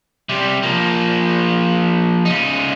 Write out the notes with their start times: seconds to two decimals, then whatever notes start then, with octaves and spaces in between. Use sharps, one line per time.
0.29 C3 G3
0.63 F3 A#3
2.25 C#3 D#4